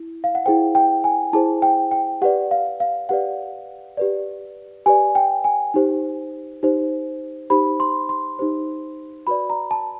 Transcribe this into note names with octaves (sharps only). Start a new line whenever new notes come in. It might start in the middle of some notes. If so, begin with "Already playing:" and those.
Already playing: E4
F5
F#5
E4 G#4 C5 G5
G5
G#5
E4 G#4 C5 A5
G5
G5
G4 B4 D5 F#5
F5
F5
G4 B4 D5 F#5
G4 B4 D5
G4 B4 D5 G#5
G5
G#5
D#4 G4 C5
D#4 G4 C5
D#4 G4 C5 B5
C6
C6
D#4 G4 C5
F#4 B4 D5 B5
A#5
A5